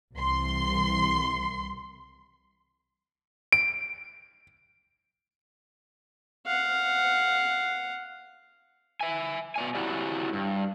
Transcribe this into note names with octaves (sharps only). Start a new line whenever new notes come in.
C2 E3 C6
D7
F5 F#5
E5 G#5
B2 D5 G#5
F#3 E4 F#4 G4 D5
G2